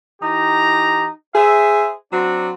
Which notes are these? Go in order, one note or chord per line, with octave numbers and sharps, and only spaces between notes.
E3 D#4 G4 A#5
G#4 C5 E5
F#3 C4 D4 F#4